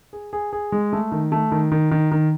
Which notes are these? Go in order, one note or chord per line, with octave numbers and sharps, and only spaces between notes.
G#4
G#4
G#4
G#3
A3
D#3
A3
D#3
D#3
D#3
D#3